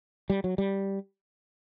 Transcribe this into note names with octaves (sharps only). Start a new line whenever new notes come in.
G3
F#3
G3